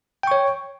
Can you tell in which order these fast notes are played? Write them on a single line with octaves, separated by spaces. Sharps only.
G5 C#6 C#5